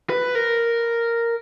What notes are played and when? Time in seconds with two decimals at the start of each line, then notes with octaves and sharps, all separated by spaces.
0.10 B4
0.35 A#4